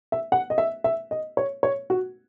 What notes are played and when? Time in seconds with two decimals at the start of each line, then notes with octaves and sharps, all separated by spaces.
0.12 E5
0.32 F#5
0.50 D#5
0.58 E5
0.84 E5
1.11 D#5
1.37 C#5
1.63 C#5
1.90 F#4